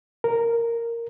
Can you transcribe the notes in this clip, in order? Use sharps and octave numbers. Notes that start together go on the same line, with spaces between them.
A#4